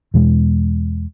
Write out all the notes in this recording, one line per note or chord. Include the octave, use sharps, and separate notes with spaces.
E2 B2 G#3